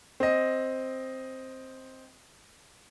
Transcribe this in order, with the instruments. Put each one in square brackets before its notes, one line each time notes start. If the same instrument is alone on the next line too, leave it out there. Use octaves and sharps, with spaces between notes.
[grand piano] C4 D#5